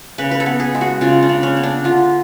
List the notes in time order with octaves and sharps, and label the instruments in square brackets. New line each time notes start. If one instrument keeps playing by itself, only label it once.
[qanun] C#3 B4
B4
A4
B3
G#4
G#3
F#4
C#3 F4
D4
C#3
C#4
B3
D4
D3 F4